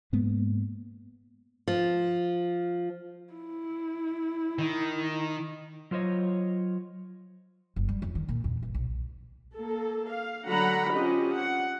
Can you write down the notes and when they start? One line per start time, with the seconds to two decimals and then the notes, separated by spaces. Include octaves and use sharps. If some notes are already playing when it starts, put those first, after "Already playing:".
0.13 G#2 G#3 A#3 B3
1.68 F3
3.33 E4
4.59 D#3
5.91 F#3 F4 C5 C#5 D#5
7.76 F#1
7.89 G3
8.02 F2
8.15 D#3
8.29 A#2
8.44 E2
8.62 G1
8.74 B1
9.58 A#3 A4
10.12 F5
10.46 D3 F#3 F#4 F#5 A#5 B5
10.94 C4 C#4 F4 G4 D#5
11.33 F#5